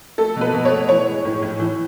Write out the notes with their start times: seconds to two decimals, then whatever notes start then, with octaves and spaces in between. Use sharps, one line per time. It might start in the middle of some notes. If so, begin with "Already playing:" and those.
0.18 A3 A4
0.36 B2 B4
0.54 B2
0.65 C#5
0.71 A3
0.89 E3 C#5
1.07 G#3
1.25 A2
1.43 A2
1.59 E3